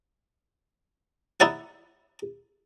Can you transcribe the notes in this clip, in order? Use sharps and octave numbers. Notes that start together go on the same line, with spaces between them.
D#4 E4 D5 F#5